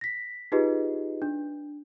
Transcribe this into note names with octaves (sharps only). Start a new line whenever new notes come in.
A#6 B6
D#4 F4 G4 G#4 B4 D#5
D4